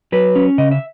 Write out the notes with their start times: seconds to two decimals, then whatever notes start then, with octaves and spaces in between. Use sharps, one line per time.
0.12 F#3 B4
0.36 C#4
0.58 C#3 D#5
0.71 E5